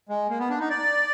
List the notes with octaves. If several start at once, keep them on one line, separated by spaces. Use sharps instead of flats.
G#3
A#3
B3
D4
D#4
D5